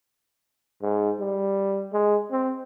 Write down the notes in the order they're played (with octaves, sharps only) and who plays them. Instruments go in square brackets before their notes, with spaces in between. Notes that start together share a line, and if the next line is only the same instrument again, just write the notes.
[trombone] G#2
G3
G#3
C4